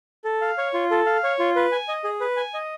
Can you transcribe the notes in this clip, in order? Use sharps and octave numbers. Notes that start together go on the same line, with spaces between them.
A4
F5
C#5
F4
A4
F5
C#5
F4
B4
G#5
D#5
G#4
B4
G#5
D#5